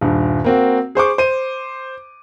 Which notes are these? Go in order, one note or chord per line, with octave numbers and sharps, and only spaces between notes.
D#1 G2
A#3 C4 F#4
G#4 C5 C#6 D6
C5 D#7